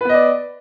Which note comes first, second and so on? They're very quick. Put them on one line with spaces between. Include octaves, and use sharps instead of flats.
B4 B3 D#5 D5